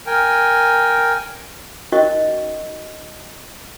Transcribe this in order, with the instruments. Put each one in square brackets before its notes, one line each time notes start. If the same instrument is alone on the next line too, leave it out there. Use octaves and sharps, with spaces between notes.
[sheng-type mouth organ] A#4 G5 G#5
[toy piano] C#4 D#4 F#4 A#4 D#5 C#6